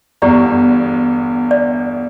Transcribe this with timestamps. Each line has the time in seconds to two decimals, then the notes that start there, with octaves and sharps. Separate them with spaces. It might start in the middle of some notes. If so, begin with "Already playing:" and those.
0.22 G1 E2 G4 D5 A#5
1.51 D5